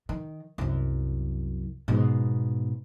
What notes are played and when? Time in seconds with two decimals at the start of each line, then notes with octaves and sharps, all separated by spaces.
0.09 D#3
0.58 C2 F#2
1.88 G#2 B2